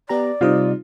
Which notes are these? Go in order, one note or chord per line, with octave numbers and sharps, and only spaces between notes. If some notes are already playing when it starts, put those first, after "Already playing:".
B3 G4 D5 A#5
C3 G3 D#4 F4 C5